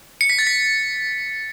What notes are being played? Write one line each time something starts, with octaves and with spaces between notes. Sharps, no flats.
C#7
B6
A6
B6